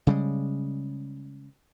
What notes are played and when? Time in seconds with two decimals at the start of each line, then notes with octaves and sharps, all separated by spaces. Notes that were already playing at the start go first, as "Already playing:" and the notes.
0.07 C#3 G3 G#3